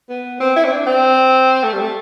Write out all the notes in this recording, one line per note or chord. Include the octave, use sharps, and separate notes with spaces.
B3
C4
E4
C4
D4
C4
A3
G3
A3